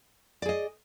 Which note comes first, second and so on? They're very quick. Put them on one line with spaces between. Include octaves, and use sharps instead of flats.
D5 G#4 D#5